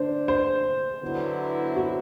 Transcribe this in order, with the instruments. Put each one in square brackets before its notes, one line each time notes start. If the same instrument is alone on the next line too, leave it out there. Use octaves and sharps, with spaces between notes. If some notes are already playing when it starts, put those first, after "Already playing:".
Already playing: [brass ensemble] D3 A3 D4 [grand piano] C5
[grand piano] C5
[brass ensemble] D3 F#3 B3 E4
[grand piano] F#4